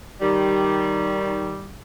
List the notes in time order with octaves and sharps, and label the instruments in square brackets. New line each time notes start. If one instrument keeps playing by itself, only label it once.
[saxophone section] D#3 G3